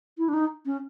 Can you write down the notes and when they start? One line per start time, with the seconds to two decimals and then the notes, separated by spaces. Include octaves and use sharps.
0.18 E4
0.29 D4
0.34 D#4
0.66 C#4